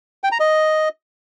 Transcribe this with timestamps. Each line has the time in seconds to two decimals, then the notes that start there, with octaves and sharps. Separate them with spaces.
0.24 G5
0.32 A#5
0.40 D#5